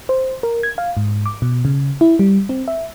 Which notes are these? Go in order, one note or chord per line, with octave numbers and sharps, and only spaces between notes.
C5
A#4
G#6
F5
G#2
D6
B2
C#3
E4
G3
C4
E5